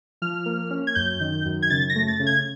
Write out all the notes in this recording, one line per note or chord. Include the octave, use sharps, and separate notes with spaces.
F3 F6
A#3
C#4
G#6
F#2 G6
D#3
F#2
G#6
C#3 A6
A#6
A3
A6
C#3
G#6